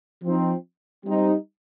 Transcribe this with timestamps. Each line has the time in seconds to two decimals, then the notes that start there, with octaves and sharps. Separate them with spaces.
0.23 F3 C4 D#4
1.05 G3 C4 D#4